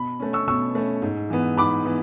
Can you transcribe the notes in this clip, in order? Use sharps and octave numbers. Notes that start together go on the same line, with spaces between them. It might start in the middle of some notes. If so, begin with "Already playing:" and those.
Already playing: B2 B5
A3 C#4
C#6 E6
B2 C#6 E6
A3 C#4
G#2
E3 B3
G#2 B5 D6
E3 B3